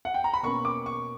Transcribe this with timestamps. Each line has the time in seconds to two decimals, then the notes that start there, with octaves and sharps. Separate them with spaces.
0.05 F#5
0.14 G5
0.24 A#5
0.34 B5
0.43 B2 A#3 C#4 C#6
0.65 D6
0.86 C#6